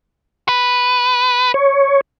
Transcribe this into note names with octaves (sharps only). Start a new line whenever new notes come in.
B4
C#5